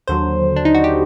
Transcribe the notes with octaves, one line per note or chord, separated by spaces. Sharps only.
D#2 D3 F#3 C5
D4
D#4
F#4
G4